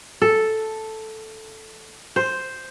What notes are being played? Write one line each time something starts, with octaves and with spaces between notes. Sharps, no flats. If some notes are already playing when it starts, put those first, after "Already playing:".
A4
C5